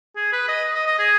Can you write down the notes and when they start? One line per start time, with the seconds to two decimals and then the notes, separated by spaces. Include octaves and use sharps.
0.16 G#4
0.33 B4
0.49 D#5
0.75 D#5
0.87 D#5
0.99 G#4